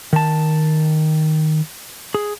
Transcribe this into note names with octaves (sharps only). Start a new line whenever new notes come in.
D#3 A5
G#4